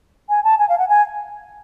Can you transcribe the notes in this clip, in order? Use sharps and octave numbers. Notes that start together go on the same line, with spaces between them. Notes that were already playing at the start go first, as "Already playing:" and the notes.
G#5
A5
G#5
F5
F#5
G#5